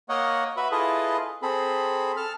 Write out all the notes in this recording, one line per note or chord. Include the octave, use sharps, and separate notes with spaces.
A#3 A#4 C#5 D#5 F#5
F#4 B4 E5 B5
E4 F4 G#4 A4 B4 D#5
C4 G#4 A4 B5
A4 A5 F6